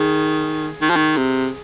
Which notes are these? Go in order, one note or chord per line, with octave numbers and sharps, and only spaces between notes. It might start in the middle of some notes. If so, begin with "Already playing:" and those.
Already playing: D#3 G#4
D#3
F3
D#3
C3